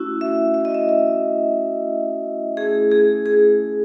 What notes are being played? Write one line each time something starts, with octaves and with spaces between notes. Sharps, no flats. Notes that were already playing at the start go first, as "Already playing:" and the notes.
Already playing: A3 C#4 E4 F#4
E5
E5
D#5
E5
D#5
A3 C#4 E4 G#4
G#4
G#4